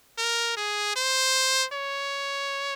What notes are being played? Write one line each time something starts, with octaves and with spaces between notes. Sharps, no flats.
A#4
G#4
C5
C#5